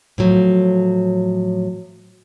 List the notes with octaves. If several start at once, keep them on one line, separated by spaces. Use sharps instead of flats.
A2 F3 F#3